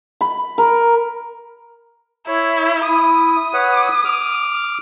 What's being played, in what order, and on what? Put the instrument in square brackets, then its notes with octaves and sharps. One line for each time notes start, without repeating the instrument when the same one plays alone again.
[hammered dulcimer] B5
A#4
[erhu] E4 [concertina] C#5
[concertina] E4 [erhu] D#6
[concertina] B4 C#5 F#5
D6 F6